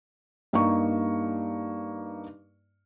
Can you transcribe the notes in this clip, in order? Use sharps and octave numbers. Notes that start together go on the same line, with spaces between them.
G2 A#3 D#4 C#6